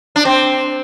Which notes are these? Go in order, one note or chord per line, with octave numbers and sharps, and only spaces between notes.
D4
C4